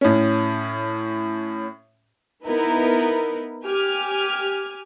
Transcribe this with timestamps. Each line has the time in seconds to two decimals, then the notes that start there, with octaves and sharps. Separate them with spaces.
0.01 A2 C#4
2.46 B3 D#4 E4 A#4 B4
3.65 G4 G#5 F6